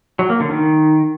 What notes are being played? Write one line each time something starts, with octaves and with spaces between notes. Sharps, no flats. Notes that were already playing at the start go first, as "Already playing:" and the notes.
F#3
A#3
D3
D#3